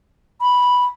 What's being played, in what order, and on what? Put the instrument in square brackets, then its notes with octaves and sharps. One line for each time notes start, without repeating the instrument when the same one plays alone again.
[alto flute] B5